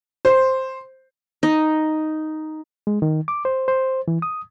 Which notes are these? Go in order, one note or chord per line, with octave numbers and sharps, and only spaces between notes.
C5
D#4
G#3
D#3
D6
C5
C5
E3
D#6